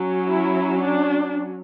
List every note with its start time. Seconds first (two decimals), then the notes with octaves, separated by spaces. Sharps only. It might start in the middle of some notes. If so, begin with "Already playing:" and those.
Already playing: F#3 C#4
0.27 E4
0.82 D4